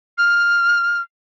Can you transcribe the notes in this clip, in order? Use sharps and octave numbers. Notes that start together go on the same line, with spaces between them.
F6